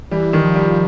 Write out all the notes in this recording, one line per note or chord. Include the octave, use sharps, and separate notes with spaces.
E3 G3
D#3
F3
G3